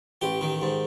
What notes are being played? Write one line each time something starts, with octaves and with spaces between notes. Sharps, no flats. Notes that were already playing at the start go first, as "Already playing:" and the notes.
A1 G4
D#3
G#2